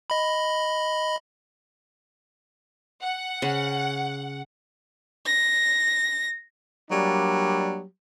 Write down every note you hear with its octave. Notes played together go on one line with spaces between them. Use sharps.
D#5 B5
F#5
C#3
A#6
F#3 G3 A#3 D4